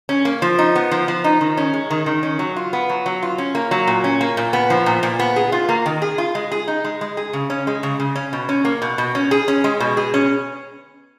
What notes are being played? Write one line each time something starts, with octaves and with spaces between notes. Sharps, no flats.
C#4
A#3
F3
D#4
B3
F3
F3
D#4
D#3
C#4
G#3
D#3
D#3
C#4
F#3
F4
B3
F#3
F#3
F4
C#4
A#3
F#3
A#2
C#4
A#3
A#2
B3
F3
A#2
A#2
B3
G#4
F4
A#3
D#3
G#4
F4
G#3
G#4
D#4
G#3
G#3
G#4
C#3
C#4
G#3
C#3
C#3
C#4
B2
C#4
A#3
B2
B2
C#4
G#4
C#4
G#3
B2
G#4
C#4